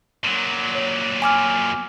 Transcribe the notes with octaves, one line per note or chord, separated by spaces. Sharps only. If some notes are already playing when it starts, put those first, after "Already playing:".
A#2 F#3
C#5
G#5 D6 F6